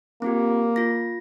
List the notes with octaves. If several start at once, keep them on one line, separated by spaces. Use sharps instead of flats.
A#3 C4 F4 G4
F4 A#6